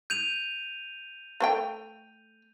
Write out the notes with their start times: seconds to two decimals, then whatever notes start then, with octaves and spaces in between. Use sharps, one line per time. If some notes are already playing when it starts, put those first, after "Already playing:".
0.10 G6 D#7 F7
1.40 A3 C5 G5